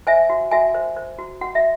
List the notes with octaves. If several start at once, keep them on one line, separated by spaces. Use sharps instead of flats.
C5 E5 G#5
F#4
F#4 E5 G#5
C5
C5
F#4
F#4 F#5
E5